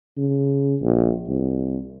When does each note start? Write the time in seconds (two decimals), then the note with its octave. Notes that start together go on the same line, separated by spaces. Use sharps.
0.18 C#3
0.82 A#1
1.28 C2